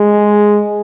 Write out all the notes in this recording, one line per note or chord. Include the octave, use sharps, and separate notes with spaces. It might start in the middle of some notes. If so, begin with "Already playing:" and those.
Already playing: G#3